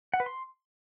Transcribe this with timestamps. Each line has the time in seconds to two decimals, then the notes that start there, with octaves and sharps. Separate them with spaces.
0.14 F#5
0.20 B4
0.26 C6